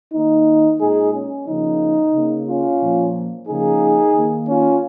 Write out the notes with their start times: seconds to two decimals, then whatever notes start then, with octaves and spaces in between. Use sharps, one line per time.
0.13 D#3 A#3 D#4
0.80 A#2 G#3 D#4 G#4
1.13 C#4
1.46 C#3 F3 A#3 D#4
2.14 C#3 A#3
2.47 C#4 F4
2.81 A#2 F3 A#3
3.47 C#3 F3 A#3 D#4 G#4
4.14 D#3 A#3
4.47 C#4 F4